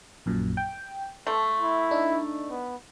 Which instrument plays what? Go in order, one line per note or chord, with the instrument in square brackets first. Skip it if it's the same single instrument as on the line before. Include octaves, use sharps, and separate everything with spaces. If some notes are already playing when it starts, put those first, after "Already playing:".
[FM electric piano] A#1 F#2 A#2
G5
[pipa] A3 [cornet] A4 [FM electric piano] C6
[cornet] E4
[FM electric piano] D4 D#4
[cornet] B3